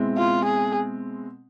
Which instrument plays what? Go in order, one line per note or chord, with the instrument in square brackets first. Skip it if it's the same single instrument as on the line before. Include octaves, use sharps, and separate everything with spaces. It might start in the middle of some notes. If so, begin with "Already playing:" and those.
Already playing: [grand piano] B2 G#3 C4 E4
[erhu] F4
G#4